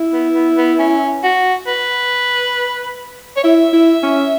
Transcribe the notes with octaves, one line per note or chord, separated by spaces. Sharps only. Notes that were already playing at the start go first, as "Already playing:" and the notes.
Already playing: E4
B3
B3
B3
C#4
F#4
B4
C#5
E4 E5
E4
C#4